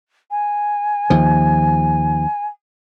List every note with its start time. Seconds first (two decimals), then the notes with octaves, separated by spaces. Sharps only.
0.31 G#5
1.10 D#2 F3